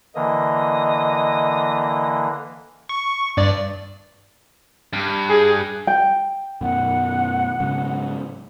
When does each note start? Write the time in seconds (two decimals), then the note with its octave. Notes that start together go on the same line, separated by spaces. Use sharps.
0.15 D3 E3 A#3 D#5
2.89 C#6
3.37 G2 D5
4.93 G2
5.30 G#4
5.87 G5
6.61 F#2 B2 D#3 F#5
7.60 G#2 C#3 F#3